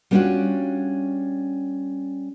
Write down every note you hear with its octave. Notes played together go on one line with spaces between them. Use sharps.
G3 B3 C#4 D4 F4 F#4